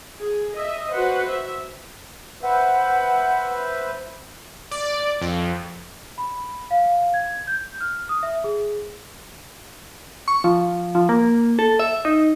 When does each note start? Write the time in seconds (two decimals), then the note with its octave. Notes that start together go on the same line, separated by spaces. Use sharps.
0.16 G#4
0.55 D#5 E5
0.92 F#4 B4 C5 F#5
1.28 E5
2.43 B4 C5 E5 F#5
4.71 D5
5.21 F2
6.18 B5
6.71 F5
7.14 G#6
7.47 G6
7.81 F6
8.09 D#6
8.23 E5
8.44 G#4
10.28 C#6
10.44 F3
10.95 F3
11.09 A#3
11.59 A4
11.79 E5
12.05 D#4